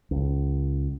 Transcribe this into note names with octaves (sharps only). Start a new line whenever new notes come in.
C#2